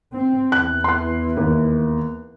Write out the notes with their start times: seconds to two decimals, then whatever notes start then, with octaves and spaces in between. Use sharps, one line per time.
0.14 C4
0.52 E2 E3 F#6
0.84 C6 F#6
1.37 D#2